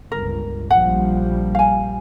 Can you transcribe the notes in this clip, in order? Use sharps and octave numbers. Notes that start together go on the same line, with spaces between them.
G1 C#2 A#4
A#1 F3 G3 F#5
F5 G#5